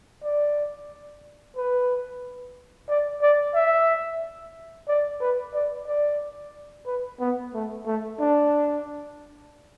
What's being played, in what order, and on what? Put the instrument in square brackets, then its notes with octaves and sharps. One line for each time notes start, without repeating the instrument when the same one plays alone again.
[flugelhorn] D5
B4
D5
D5
E5
D5
B4
D5
D5
B4
B3
A3
A3
D4